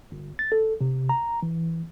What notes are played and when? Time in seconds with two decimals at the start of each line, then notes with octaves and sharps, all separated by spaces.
0.12 G1
0.39 A6
0.52 A4
0.81 C3
1.09 A#5
1.43 E3